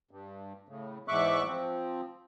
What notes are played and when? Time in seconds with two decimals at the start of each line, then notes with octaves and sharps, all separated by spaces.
0.11 G2
0.69 A2 C#3
1.08 E2 G#2 E5 C#6 D6 F#6
1.46 F3 C4